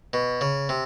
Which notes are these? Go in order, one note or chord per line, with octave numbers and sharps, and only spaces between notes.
B2
C#3
C3